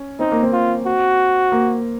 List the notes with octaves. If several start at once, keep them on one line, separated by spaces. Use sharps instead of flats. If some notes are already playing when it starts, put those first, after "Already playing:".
Already playing: C#4
C4 D#4
A#3
C4
F4
F#4
A#3